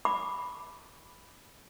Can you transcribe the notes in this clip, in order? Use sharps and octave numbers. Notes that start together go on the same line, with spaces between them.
B5 D6